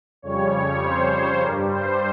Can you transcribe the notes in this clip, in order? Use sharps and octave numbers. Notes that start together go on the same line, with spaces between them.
F2 C#3 G3 C#5
C5
G2 G3 A#4
C5